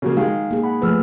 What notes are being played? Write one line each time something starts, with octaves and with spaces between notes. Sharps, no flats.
C#3 F#3 A#3
D#3 G#3 F5
A#3 G#4
F#5 B5
F3 A3 G#4 B4 E6 F6